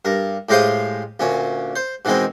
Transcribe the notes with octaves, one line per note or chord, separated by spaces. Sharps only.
G2 A#4
A2 G#3 G4 C5 F5 D#6
D2 A#2 C#4
C5
B2 D#3 E3 G#3 C4